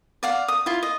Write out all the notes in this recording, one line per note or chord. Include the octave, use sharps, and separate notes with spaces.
D5 F5 F#5
D#6
E4 F4
D#5